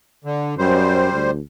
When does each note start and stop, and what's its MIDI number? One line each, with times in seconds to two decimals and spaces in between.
0.24 0.55 50
0.58 1.11 42
0.58 1.31 55
0.58 1.31 72
1.13 1.39 38